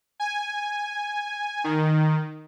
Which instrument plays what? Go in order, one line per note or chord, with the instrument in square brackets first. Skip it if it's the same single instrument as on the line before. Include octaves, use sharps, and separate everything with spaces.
[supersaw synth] G#5
D#3